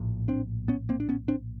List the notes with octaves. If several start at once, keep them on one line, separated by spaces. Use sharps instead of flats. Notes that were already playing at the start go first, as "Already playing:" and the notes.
Already playing: A#1 A2
C4 D4
B3 C#4
A#3 C4
D4
B3 C#4
C4 D4